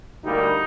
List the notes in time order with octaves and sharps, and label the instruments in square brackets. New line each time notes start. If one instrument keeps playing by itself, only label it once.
[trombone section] D2 D3 G3 A#3 D#4